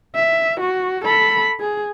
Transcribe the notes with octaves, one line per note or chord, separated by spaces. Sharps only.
E5
F#4
A4 B5
G#4